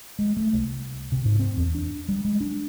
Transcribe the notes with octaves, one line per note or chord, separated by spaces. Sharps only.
G#3
A3
C2
C3
G#2
C4
E2
D4
G3
G#3
D4